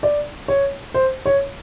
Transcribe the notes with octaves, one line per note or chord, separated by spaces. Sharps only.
D5
C#5
C5
C#5